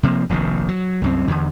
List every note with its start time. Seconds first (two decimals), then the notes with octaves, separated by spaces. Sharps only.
0.03 C3 F3 G3 A#3
0.29 F1 A#1 C3 D#3
0.68 F#3
1.02 C2 F#2 C4
1.28 E2 D3